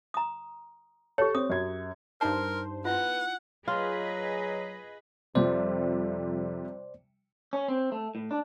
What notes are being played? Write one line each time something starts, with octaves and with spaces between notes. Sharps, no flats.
A#5 D#6
G4 A4 C#5
C4 D#6
F#2 G#6
G2 D#4 A#4 C5 A5
B3 E4 F4 F#5
F#3 F4 G#4 B4 D#5
F2 C3 F3 G3 C5 D5
C#4
C4
A3
A2
D4